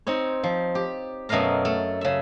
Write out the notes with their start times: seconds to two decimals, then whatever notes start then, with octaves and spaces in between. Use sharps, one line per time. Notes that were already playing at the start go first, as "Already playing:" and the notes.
0.07 C4 D#4 C#5
0.43 F3
0.75 G4
1.29 F#2 B2 A3 D#5 F5 A#5
1.65 A3 A4
2.01 C#3 E5